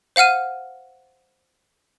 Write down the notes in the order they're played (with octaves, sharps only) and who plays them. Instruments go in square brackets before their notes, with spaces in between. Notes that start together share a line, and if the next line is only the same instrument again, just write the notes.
[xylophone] C5 F5 F#5 F6 D#7